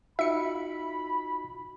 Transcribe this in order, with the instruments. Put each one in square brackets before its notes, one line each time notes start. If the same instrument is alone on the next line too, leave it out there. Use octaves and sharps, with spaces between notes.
[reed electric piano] D#4 F4 F#4 [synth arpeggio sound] E5 C#7 [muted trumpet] B5